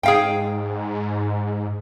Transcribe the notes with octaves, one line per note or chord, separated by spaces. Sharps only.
G#2 G#4 F5 G5